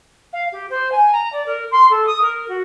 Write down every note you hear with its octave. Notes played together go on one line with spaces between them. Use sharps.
F5
G4
C5
G#5
A#5
D5
A#4
C6
A4
D#6
A#4
F#4